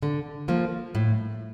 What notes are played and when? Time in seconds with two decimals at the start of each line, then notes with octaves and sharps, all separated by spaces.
0.02 D3
0.48 F3 A#3
0.95 A2